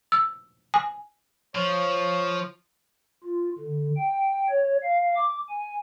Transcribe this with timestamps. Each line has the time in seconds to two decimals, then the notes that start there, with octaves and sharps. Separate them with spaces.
0.12 E6
0.74 G#5
1.55 F3 C#5
3.23 F4
3.59 D3
3.97 G5
4.49 C#5
4.83 F5
5.16 D6
5.49 G#5